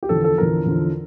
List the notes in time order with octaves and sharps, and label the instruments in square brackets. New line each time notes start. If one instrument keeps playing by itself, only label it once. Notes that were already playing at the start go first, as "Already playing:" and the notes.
[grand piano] G4
E2 D3 F3 A4
A4
E2 D3 F3 A#4
E2 D3 F3